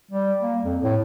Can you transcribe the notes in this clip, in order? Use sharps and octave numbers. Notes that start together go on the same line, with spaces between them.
G3
A#3
F2
A2